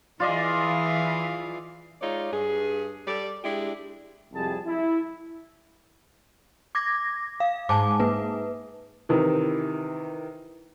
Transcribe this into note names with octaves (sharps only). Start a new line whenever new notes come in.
E3 F4 G#4 D5 D#5 F5
G#3 D#4 F4 C#5 D5
G2 G#4
G3 A4 D5
G#3 D4 E4 G4
C2 F2 G3 G#4 A5
E4
D6 G#6 A#6
F5
G#2 G#5 A5 D6
A#3 B4
C3 D#3 E3